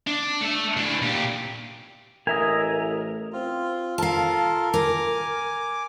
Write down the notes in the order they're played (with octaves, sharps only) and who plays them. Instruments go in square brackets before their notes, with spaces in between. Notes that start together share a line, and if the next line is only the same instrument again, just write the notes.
[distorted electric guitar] D4
A3 E5
E3 D4
A#2 G4
[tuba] A1 [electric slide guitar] A#4 [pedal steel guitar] D#5 E5 G#5
[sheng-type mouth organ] C4 F4
[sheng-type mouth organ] F4 A4 A#4 [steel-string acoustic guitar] F5 A5
[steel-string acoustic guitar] A#4 [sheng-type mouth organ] G#5 D6